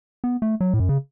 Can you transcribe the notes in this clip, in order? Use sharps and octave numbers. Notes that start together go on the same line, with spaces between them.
B3
A3
F#3
A2
F#2
C#3